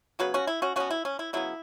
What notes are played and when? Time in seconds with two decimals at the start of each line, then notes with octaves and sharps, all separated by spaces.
0.19 C#3 F#3 B3 F#4 B4
0.34 C#4 F#4
0.47 E4
0.62 C#4 F#4
0.76 B2 B3 C#4 F#4
0.90 E4
1.05 C#4
1.19 E4
1.33 C#3 F#3 B3 E4